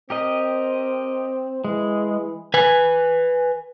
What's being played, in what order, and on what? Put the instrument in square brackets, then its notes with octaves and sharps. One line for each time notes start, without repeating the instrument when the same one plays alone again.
[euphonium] C4 [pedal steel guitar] G4 A#4 D#5
[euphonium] E3 [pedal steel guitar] G#3
[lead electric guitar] B4 G#5